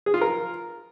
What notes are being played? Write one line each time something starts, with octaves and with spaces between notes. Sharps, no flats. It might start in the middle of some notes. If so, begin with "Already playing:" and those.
G#4
F4
A#4